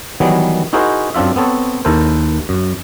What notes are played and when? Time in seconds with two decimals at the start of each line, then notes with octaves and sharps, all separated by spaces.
0.20 D#3 E3 F#3 G3 B3
0.73 D#4 E4 F#4 G#4 A#4 C5
1.14 F#2 C4 D4 F4 E5
1.36 B3 C4 A4 C#5
1.85 D#2 E4 A4 A#4 C5
2.49 F#2